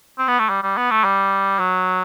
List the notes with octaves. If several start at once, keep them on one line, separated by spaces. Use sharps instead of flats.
C4
B3
A3
G3
G3
B3
A3
G3
F#3